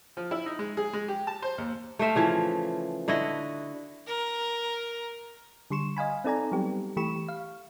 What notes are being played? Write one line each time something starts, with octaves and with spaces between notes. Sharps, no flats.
F3
E4
D#4
G#3
G#4
G#3
G4
A5
C5
D#2
A3 C5 E5 F5
C#3 E3 F3
D3 E4 F#4 D#5
A#4
D3 G3 C6 C#6 E7
D#5 F5 G#5 B5
C4 D#4 A4 D5 G#5 A#5
F#3 G3 B3 G4
E3 A3 G4 B5 C#6 E7
F5